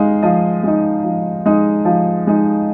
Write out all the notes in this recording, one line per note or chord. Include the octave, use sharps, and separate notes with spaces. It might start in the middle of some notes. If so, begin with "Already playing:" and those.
Already playing: G#3 D#4 F5
F3 D#5
G#3 D#4
F3
G#3 D#4
F3
G#3 D#4